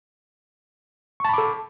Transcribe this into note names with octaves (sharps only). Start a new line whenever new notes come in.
A4 A5 B5 C#6 D6